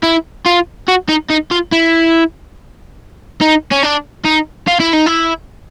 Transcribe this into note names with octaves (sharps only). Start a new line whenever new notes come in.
E4
F4
F#4
D#4
D#4
F4
E4
D#4
C#4
D4
D#4
F4
E4
D#4
E4